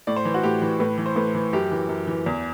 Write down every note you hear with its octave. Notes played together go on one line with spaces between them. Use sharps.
A2 D5
C5
E3
F#4
A2 G4
E3
A2 B4
E3
C5
A2 B4
E3
F#2 G4
E3
F#2
E3
E2